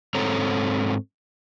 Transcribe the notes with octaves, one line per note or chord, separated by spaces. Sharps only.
G#2 C4 A4 C#5 A#5